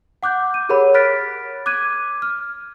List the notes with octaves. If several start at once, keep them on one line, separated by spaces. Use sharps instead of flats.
F#5 D6 F#6 G6
D#7
G4 G#4 A#4 C#5 F#5 B5
B5 F6 F#6 A6 B6 D7
D6 F#6 G#6 D#7
F6